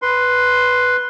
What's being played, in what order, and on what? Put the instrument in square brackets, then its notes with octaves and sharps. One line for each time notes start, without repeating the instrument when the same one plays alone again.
[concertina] B4 C6